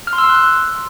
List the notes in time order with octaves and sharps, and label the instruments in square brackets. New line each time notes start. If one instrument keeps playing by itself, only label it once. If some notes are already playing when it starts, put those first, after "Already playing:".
[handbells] F6
C6
E6
C6
F#6